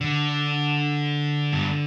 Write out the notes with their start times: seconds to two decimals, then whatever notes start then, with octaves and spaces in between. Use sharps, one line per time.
0.01 D3
1.52 G2